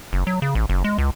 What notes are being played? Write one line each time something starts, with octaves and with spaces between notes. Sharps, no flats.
F#1
F#3
C#3
A1
F#1
G#3
C#2